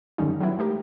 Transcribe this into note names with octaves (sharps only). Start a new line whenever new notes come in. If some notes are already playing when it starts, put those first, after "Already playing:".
F#2 D3 D#3 G3 C#4 D#4
F#3 G3 B3 E4
G#3 A3 G4 A#4